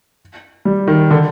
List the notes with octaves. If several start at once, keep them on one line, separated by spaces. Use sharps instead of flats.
G3
D#3
D3